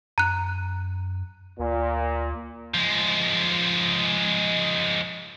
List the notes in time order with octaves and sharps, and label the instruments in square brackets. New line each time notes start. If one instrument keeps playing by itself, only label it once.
[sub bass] F#2 [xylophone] A#5 F#6
[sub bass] D2 [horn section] A#2
[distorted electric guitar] F3 G#3